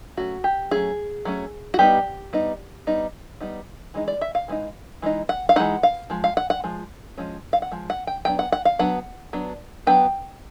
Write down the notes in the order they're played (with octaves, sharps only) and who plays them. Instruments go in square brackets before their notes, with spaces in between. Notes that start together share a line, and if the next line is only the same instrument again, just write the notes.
[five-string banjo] F#3 A3 C#4 F#4
G4
F#3 A3 C#4 G#4
F#3 A3 C#4
F#4
G3 B3 D#4 G4
G3 B3 D#4
G3 B3 D#4
G3 B3 D#4
E3 G#3 D#4
D5
E5
F5
E3 G#3 C4 D#4
E3 G#3 D#4
F#5
F5
E3 G#3 C4 D#4 F#5
F5
F3 G#3
F5
F#5
F#5
F3 G#3
F3 G#3 C#4
F5
F#5
F3 G#3
F#5
G5
F#3 B3 D4 G5
F#5
F#5
F5
F#3 B3 D4 F#5
F#3 B3 D4
F#3 B3 D4 G5